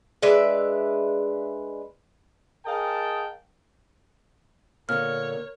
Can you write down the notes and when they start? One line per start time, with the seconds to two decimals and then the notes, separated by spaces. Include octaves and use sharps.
0.22 G#3 D4 B4 E5
2.65 G#4 A#4 D#5 F5 G5 A5
4.89 A#2 D3 A#4 C#5 F6